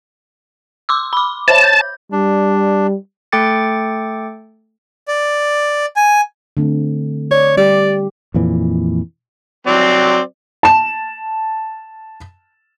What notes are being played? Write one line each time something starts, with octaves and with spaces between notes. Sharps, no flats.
C6 D6 E6
B5 D6
C5 C#5 A5
G6
G3 D4
A3 A4 G5 D6 A6 C#7
D5
G#5
D3 A3 C4
C#5 D5
G3 G4 D5
F2 A#2 E3
F#3 C4 D5
A5 E7